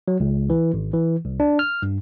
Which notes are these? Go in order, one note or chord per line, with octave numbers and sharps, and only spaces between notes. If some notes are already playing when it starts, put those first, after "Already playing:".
F#3
C#2
E3
G#1
E3
C2
D4
F6
G2